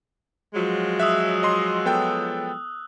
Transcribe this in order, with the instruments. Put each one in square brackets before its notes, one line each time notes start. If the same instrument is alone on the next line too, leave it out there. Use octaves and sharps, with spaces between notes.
[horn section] F3 F#3 G#3
[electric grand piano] E5 [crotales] D#6 E6 F#6
[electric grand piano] D#5 C6
B3 A4 G5